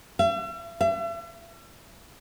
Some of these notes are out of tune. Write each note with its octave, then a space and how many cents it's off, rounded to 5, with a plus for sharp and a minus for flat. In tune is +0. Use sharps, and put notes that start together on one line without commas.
E5 +45
E5 +40